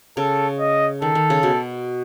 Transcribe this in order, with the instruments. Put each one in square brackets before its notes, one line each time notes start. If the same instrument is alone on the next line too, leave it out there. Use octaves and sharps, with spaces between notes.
[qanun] C#3 [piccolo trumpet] A4
[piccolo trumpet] D#5
[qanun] D#3 [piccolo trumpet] A4
[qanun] D#3
C#3
B2